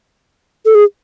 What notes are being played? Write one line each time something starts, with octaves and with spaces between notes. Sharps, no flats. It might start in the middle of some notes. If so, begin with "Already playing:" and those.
A4
G#4